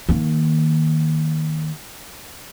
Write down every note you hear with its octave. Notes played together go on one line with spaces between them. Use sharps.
D#3 A#3